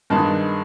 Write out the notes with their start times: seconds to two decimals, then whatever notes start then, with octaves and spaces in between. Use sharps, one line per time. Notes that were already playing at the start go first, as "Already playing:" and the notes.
0.10 G2 D#3 G#3 B3 A5